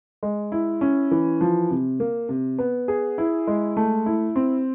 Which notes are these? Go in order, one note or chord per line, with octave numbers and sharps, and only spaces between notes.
G#3
E4
C#4
E3
F3
C3
A#3
C3
B3
G#4
E4
G#3
A3
E4
C4